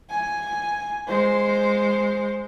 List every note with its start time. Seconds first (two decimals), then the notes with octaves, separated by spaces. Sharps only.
0.10 G#5
1.08 G#3 C5